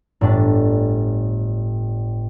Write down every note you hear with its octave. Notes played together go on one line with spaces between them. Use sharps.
G1 A2 D4 A5